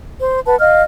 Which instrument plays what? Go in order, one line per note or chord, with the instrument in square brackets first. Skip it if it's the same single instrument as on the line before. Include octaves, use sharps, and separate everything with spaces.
[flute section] C5
B4 F#5 A5
D#5 F5 F6